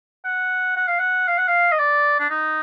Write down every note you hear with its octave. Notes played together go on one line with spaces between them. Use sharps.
F#5
F#5
F5
F#5
F5
F#5
F5
D#5
D5
D4
D#4